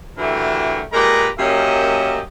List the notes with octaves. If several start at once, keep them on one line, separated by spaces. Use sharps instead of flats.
D3 E3 A3 F#4 G4 A#4
A#2 G#3 G4 A#4 B4 A#5
F#2 A#3 C#4 G4 D#5 E5